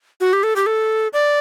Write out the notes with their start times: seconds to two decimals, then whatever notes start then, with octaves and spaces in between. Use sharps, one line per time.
0.21 F#4
0.33 G4
0.43 A4
0.56 G4
0.66 A4
1.13 D5